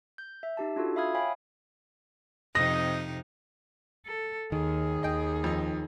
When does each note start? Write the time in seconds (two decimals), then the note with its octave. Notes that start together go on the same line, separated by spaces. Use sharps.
0.18 G6
0.43 E5
0.57 D#4 G4 A5
0.76 D4 F4 F#4 A4
0.96 E5 F5 B5 D#6 F6 G#6
1.15 C#5 F5 G5 G#5 B5
2.55 F2 C3 D#4 D#5 A#6
4.06 A4
4.52 D#2 D#3 G#4
5.03 D#2 D#5 G5
5.44 F2 D#4